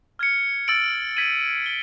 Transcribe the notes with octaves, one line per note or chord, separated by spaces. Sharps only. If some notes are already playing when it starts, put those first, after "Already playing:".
F6 G#6 C#7
E6 A6 D7 F#7
G#6 B6 D#7 F#7
D7 G7